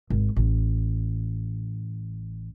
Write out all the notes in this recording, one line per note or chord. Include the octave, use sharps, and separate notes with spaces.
G#1
A1